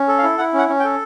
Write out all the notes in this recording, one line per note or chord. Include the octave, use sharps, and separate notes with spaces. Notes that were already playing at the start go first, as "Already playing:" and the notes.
Already playing: C#4
A4
F5
E4
E4 F#5
C#4
F#5
C#4
G5
A4